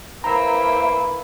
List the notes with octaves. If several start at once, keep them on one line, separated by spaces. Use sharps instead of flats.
A#3 E4 B4 C5 E5 G5 A#5